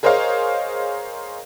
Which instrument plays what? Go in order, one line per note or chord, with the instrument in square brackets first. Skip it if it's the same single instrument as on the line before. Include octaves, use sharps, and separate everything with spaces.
[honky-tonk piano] G#4 A#4 C5 C#5 D#5 F5